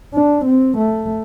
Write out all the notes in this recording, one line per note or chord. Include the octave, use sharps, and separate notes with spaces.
D4
C4
A3